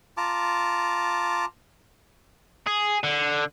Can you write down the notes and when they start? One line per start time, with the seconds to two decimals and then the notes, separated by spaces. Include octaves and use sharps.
0.17 F4 A5 A#5 D6
2.67 G#4
3.03 D3